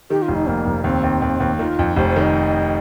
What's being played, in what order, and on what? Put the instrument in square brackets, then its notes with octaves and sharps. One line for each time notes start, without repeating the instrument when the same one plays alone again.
[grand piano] D#3 [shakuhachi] G4
[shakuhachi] F4
[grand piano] F1
[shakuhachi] D#4
[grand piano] F2 [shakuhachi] A#3
[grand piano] F1
[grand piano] D#2 [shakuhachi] C4
[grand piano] D#2
D#2
D#2
[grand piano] D#3 [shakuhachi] F4
[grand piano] F2
[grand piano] F1 [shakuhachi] C5
[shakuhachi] C5
[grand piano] D#3
[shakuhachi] D#5